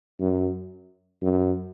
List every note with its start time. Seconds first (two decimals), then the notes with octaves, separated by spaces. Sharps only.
0.20 F#2
1.22 F#2